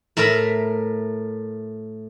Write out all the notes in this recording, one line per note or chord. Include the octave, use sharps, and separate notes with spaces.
A2 A#4 E5 A#5 B5